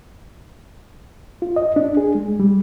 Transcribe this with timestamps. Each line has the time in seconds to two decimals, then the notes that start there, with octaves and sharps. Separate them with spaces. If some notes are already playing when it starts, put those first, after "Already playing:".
1.42 F4
1.56 D#5
1.76 D4
1.97 G#4
2.15 G#3
2.40 G3